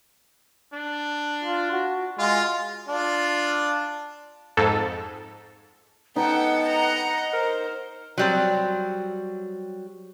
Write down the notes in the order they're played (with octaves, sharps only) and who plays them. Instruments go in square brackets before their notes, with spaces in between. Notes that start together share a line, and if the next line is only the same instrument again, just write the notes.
[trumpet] D4
[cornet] F4
F#4
[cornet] G#3 [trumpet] F4
[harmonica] D4 F4
[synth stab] F2 G#2 A4
[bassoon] B3 [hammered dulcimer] D#4 [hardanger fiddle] A4 G5 [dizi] F#5
[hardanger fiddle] D#5 A#5
[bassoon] A#4 [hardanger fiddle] C5
[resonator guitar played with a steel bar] F#3 G3 C4